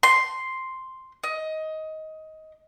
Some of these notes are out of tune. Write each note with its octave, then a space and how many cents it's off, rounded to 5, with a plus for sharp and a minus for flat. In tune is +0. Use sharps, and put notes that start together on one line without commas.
C6 +0
D#5 +15